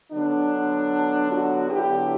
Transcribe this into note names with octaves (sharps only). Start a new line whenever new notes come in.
D3 F#3 B3 D4
D4 F#4
D3 F#3 B3 E4 G4